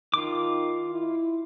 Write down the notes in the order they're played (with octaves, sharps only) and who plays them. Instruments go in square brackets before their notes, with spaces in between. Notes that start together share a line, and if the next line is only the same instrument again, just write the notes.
[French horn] D#3 [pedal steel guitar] F4 D6
[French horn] E4